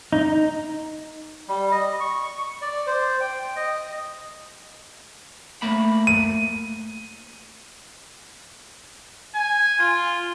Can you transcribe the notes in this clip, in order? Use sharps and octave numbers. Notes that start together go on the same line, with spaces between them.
D#4
G3
D#5
C#6
D5
C5
G5
D#5
A3 A#3 B5
D#7
G#5
F4